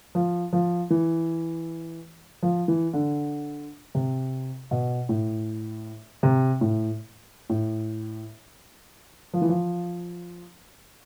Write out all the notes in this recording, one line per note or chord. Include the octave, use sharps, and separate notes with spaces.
F3
F3
E3
F3
E3
D3
C3
B2
A2
C3
A2
A2
F3
E3
F3